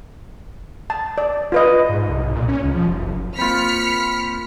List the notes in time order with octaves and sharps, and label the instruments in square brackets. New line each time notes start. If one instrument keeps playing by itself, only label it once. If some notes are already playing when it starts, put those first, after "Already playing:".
[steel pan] A5
D5
F4 B4 D#5
[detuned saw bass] G#2
C2
B1
A#2
C#4
C#2
F3
F1
F#1
[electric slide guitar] A#3 C4 [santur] F4 B5 [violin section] F6 B6 C#7